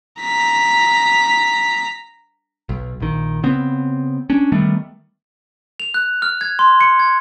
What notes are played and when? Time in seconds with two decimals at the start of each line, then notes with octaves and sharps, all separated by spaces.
0.21 A#5 B6
2.69 B1
3.00 A#1 D#3
3.43 C#3 B3 C4
4.30 C#4 D4
4.52 D#3 G3 A3 B3
5.80 F7
5.94 F#6
6.22 F6
6.41 G#6
6.59 C6
6.81 C#7
6.99 G#6